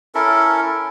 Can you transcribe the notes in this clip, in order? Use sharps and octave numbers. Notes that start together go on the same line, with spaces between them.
C#4 E4 A4 A#4